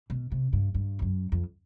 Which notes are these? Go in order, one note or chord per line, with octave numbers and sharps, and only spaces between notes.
B2
C3
G2
G2
F2
F#2
F2